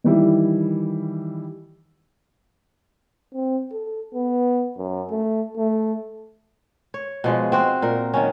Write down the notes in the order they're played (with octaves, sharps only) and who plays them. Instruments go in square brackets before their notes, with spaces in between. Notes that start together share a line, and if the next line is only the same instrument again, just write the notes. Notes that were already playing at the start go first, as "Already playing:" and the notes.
[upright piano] D#3 E3 G3 E4
[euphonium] C4
A4
B3
F#2
A3
A3
[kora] C#5
B2 F3 G#3
C4 F#4 C5
A#2 A#4
D#3 F#3 C#4